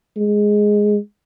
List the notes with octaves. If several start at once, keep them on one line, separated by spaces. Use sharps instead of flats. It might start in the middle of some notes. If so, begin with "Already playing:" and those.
G#3